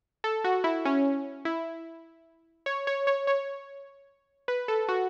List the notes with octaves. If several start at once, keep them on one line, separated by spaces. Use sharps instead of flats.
A4
F#4
E4
C#4
E4
C#5
C#5
C#5
C#5
B4
A4
F#4